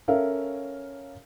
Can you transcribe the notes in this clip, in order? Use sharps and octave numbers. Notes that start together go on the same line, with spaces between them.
C#4 A4 A#4 C#5 E5 F5